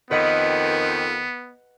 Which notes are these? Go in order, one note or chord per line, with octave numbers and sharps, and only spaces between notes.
F2 D#3 B3 B4 D#5 F#5